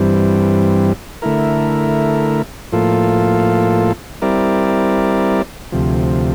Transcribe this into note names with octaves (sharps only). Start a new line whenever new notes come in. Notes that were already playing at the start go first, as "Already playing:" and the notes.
Already playing: G2 E3 G3 C4
D3 A3 E4 A#4
A2 F3 A#3 F4 A4
G3 C4 E4 A#4 D5
D2 C3 F3